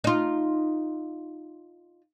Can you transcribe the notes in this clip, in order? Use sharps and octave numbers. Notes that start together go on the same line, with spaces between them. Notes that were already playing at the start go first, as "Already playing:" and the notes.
D#4 F4